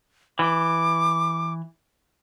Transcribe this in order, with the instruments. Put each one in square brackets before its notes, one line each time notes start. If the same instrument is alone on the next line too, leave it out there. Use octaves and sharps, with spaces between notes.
[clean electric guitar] E3 [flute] D6